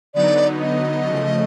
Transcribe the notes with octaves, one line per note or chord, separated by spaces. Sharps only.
D3 F#3 B3 D#4 D5
D#5
C#3 F3 A3